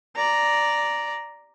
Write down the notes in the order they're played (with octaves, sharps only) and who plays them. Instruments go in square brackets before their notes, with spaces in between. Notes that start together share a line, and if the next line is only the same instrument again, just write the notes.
[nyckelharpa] D5 A#5